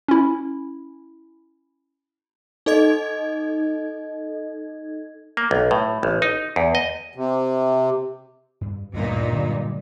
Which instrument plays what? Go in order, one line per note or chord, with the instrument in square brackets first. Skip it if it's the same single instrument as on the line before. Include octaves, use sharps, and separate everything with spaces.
[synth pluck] C#4 E4
[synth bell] D#4 A4 D#5 G#6
[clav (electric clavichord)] A#3
B1
A2
A1
D#4
E2
D#5
[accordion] C3
[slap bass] G2
[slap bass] D2 [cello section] G2 A#2 D#4
[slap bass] D3 F#3 G#3